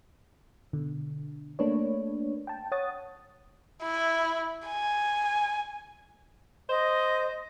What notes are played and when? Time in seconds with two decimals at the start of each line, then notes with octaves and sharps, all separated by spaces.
0.73 B2 D3
1.59 A3 A#3 D4 B4 C#5
2.47 G5 A5
2.72 C#5 F#5 D#6 A6
3.82 E4
4.67 G#5
6.69 C5 D#5